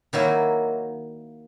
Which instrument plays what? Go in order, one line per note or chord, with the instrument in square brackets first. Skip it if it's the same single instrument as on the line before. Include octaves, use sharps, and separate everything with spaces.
[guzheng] D#3 F#3 A#3 E4